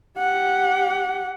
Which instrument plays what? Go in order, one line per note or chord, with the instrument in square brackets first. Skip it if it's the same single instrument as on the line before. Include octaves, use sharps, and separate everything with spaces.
[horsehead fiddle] G4 F#5